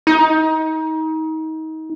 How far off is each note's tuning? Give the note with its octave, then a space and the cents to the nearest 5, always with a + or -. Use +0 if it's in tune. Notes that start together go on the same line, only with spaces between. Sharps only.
D#4 +30